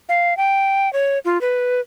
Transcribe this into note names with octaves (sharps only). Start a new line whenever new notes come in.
F5
G5
C#5
F4
B4